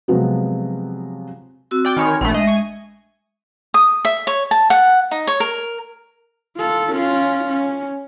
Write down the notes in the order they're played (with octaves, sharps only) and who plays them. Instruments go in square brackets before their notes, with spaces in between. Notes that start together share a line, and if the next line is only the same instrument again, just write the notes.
[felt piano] C3 F3 F#3 G#3 B3
[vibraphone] C4 F#4 E6
[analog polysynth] D5 G5 D6
[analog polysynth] D#3 C#5 F6 [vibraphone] G#5 B5 C6
[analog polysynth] A#1 A3 [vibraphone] D4
[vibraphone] G#3 E5 [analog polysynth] D#5
[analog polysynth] G#5 C#6
[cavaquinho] D#6
E5
C#5
A5
F#5
D#4
C#5
A#4
[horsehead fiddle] F4 A4
C#4 F4
C#4